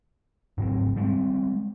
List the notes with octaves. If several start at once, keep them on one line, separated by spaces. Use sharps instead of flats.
G#2 C#3 F#3 C4
G3 G#3 C4